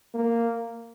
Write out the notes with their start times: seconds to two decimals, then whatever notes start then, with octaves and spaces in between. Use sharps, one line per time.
0.14 A#3